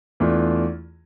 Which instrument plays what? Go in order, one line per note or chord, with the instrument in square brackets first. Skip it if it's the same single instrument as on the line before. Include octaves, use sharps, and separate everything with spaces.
[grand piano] E2 E3 A3 D4 F4